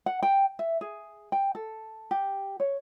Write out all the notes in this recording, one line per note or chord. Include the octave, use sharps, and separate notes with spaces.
F#5
G5
E5
G#4
G5
A4
G4
C#5